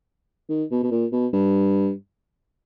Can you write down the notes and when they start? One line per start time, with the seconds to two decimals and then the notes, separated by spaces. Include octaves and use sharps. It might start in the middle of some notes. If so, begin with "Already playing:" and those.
0.50 D#3
0.71 B2
0.83 B2
0.91 A#2
1.12 B2
1.33 G2